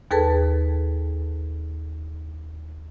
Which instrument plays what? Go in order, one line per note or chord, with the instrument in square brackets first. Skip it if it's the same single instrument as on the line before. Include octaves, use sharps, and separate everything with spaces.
[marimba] D#2 G#4 A4 B4 A5